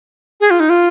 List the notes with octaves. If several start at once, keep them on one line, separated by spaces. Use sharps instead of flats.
G#4
F4
D#4
F4